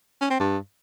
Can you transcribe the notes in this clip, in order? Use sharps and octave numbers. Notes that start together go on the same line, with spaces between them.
C#4
C4
G2